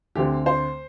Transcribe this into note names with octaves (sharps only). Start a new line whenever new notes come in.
D2 D3 C4 G4
C5